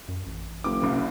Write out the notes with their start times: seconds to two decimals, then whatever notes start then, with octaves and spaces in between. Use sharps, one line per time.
0.08 F#2
0.27 A1
0.64 F#1 D6
0.81 C2 C#3